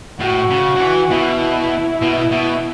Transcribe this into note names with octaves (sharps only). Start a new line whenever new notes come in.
A2 F#4
C#3
F#3
E3
B2 E4
B2
B2